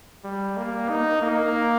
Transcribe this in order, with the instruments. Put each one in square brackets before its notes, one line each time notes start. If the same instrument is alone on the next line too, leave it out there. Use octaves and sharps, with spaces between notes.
[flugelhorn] G3
A#3
D#4
A#3